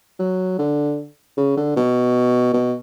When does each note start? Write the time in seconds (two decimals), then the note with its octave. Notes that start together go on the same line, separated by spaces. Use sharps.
0.19 F#3
0.59 D3
1.37 C#3
1.57 D3
1.76 B2
2.53 B2